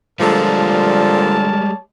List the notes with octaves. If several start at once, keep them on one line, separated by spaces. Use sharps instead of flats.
A#2 D3 F3 G3 G#3 A#4 C#5 A5